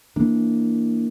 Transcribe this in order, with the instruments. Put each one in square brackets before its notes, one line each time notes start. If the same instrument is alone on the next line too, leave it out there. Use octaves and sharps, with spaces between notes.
[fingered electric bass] E3 A#3 D4